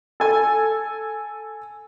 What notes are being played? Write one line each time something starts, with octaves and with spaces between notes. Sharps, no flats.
A4 G#5